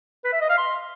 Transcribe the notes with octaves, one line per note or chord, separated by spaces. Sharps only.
B4
E5
D#5
F5
C6